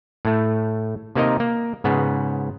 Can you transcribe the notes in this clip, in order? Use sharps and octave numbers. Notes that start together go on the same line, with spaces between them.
A2 A3
C3 A#3 D#4 A#4 D#5
A#3
G#2 C#3 B3